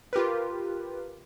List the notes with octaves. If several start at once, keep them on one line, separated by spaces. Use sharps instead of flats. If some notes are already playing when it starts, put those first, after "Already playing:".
F4 G4 A#4 B4